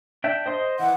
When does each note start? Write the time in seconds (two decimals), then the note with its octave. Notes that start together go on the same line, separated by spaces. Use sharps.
0.24 D4 E5 G5
0.46 C5 D#5 C6
0.79 E3 F#5